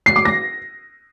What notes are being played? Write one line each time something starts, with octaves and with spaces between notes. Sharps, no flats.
C7
D6
A#6